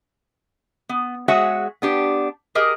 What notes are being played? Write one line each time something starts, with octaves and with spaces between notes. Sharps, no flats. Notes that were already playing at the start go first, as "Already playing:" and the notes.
B3
G#3 F#4 G#4 C#5 E5 F#5
B3 D4 G4
G4 G#4 A#4 D#5